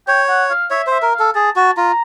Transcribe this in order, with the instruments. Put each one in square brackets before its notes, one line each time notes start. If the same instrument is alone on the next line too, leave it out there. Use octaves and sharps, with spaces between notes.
[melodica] C#5 [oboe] G5
[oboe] F#5
F5
[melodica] C#5 [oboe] E5
[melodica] C5
[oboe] E5
[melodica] A#4
[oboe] F5
[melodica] A4
[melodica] G#4 [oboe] A5
[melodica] F#4 [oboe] A5
[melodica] F4 [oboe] A#5